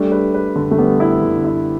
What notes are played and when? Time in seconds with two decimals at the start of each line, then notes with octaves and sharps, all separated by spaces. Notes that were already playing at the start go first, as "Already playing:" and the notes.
Already playing: G3 A3 D4
0.12 B4
0.34 B4
0.56 D3
0.71 A3
0.78 G3 B3
1.00 E4
1.22 D3
1.44 E4